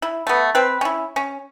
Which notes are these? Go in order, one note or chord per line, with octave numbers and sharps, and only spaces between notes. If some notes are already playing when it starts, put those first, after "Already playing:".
E4
A3 B3
C4 B4
C#4 E4
C#4